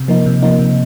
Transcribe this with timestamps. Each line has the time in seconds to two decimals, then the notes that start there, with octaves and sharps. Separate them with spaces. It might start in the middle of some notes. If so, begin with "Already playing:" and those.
Already playing: C3
0.08 F3 A#3 D#4
0.26 C3
0.42 F3 A#3 D#4
0.59 C3